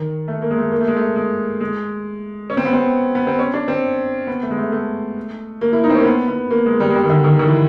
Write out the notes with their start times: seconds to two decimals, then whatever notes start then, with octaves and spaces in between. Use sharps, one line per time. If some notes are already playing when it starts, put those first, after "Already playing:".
Already playing: D#3
0.28 A3
0.42 A#3
0.51 G#3
0.57 A3
0.72 A#3
0.81 A3
0.88 G#3
0.96 A3
1.16 G#3
1.61 G#3
2.50 C#4
2.57 C4
2.65 B3
2.73 C4
3.15 B3
3.27 C4
3.39 C#4
3.54 D4
3.68 C4
4.27 B3
4.43 A3
4.51 G#3
4.57 A3
4.72 A3
5.61 A#3
5.73 E4
5.84 D#4
5.90 C4
5.94 C#4
6.00 A#3
6.05 B3
6.28 B3
6.51 A#3
6.66 G#3
6.80 G3
6.90 G#3
6.95 G3
7.04 D#3
7.10 D3
7.24 D#3
7.39 D#3
7.47 E3